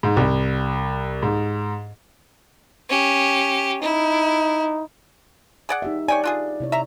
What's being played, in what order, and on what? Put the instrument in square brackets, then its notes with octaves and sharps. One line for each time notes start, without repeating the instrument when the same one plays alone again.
[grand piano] G#2
C2
G#2
[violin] C#4 G4
[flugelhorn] D#4 [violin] E4
[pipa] G#4 D5 F#5
[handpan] D#4 G4 E5
[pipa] C#5 G5 G#5 [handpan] D5
[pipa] D4 F4 G#4
[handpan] C3 E4 C#5
[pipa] E5 A#5